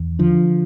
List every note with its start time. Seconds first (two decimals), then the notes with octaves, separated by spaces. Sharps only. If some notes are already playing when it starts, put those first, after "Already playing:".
Already playing: E2
0.19 D3 F3